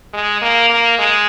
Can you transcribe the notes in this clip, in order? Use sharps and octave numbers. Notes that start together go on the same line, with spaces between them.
G#3
A#3
A#3
G#3